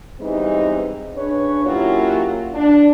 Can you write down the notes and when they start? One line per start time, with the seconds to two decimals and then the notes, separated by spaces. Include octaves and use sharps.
0.20 E3 G3 G#3 B3 C4 D#4
1.15 C#3 D4 B4 C#5
1.66 F#3 A#3 C#4 E4 F4 G4
2.54 D4